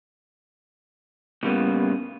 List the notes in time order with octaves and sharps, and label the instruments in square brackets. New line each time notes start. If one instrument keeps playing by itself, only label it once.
[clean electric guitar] A2 C#3 G3 A#3 B3